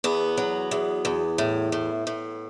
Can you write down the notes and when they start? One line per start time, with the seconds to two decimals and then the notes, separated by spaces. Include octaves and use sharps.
0.04 E2 B3
0.37 F#3
0.71 E2
1.05 E2
1.38 A2
1.72 A2
2.07 A2